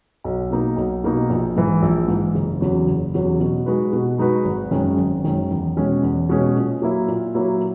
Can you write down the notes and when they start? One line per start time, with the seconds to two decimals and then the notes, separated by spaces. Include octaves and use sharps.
0.24 B1
0.51 B2 A#3 D#4
0.77 B1
1.04 B2 A#3 D#4
1.29 A#1
1.56 G#2 E3
1.82 A#1
2.08 G#2 E3
2.35 F#1
2.61 E2 C#3 F#3
2.87 F#1
3.14 E2 C#3 F#3
3.40 B2
3.66 G#3 D#4 F#4 B4
3.93 B2
4.18 G#3 D#4 F#4 B4
4.45 G#1
4.71 F#2 D#3 G#3 C#4
4.98 G#1
5.24 F#2 D#3 G#3 C#4
5.51 E2
5.76 B2 G#3 C#4 G#4
6.03 E2
6.29 B2 G#3 C#4 G#4
6.56 A#2
6.82 F#3 A#3 E4
7.08 A#2
7.34 F#3 A#3 E4